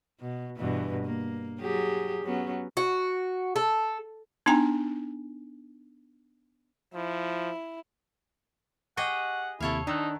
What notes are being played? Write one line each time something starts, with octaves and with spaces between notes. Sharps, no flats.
B2
G2 B2 E3
A#3
F#3 G4 G#4
F#3 B3 C#4
F#4
A4
B3 D4 D#4 G5 G#5 A#5
F3 E4
G4 G#4 D#5 F#5 C#6
D#2 C3 E4 A4 C#5 F5
D#3 D4 D#4 E6 F#6